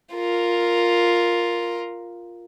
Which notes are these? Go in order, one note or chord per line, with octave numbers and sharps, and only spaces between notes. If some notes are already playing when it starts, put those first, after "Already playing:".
F4 A#4